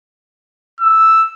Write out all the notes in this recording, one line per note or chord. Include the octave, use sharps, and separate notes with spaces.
E6